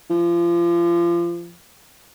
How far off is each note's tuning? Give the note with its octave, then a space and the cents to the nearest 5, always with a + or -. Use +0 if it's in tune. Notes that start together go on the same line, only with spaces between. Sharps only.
F3 -30